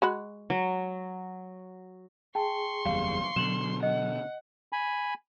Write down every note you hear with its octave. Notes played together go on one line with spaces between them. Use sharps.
G#3 F#4 B5
F#3
G#4 G5 A5 C6 C#6
F#1 E2 G3 F5
B2 D3 F#3 E7 F#7
D#5 F#5
G#5 B5